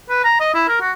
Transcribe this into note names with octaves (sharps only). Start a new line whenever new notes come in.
B4
A#5
D#5
E4
A#4
F#4